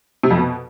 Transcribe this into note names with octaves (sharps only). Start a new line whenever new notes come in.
C3
F2
B2